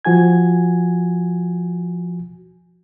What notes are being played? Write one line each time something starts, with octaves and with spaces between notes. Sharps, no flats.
F3 F#4 G#5 G#6